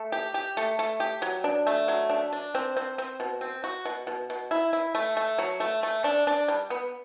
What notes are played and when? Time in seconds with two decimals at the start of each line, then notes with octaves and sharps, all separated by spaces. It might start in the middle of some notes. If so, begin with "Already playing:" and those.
Already playing: A3
0.12 G4
0.34 G4
0.57 A3
0.79 A3
1.00 G4
1.22 F#3
1.44 D4
1.67 A3
1.88 F#3
2.10 D4
2.32 D4
2.55 C4
2.76 C4
2.98 C4
3.20 B2
3.41 C4
3.64 F#4
3.85 B2
4.07 B2
4.30 B2
4.51 E4
4.73 E4
4.95 A3
5.17 A3
5.38 F#3
5.60 A3
5.83 A3
6.04 D4
6.27 D4
6.48 G3
6.70 B3